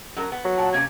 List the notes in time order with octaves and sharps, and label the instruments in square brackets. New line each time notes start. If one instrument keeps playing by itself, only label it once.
[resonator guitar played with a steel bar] F#3 C#4 A#4
B3
[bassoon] F#3
[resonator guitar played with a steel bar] A#2 F#5 [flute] A5
[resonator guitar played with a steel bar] C3 A#3 C#4 [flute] G#6